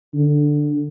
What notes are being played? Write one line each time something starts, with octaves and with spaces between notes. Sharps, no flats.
D3